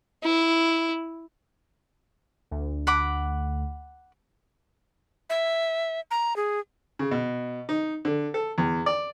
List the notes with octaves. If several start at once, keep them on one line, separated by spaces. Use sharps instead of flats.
E4
D2
F#5 B5 D6
E5
A#5
G#4
C#3
B2
D#4
D3
A4
E2
D5